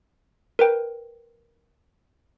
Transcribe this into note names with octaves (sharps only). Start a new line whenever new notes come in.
A#4 B4 G5